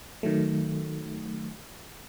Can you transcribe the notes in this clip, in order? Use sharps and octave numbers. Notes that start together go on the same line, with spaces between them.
D#3 F#3 A3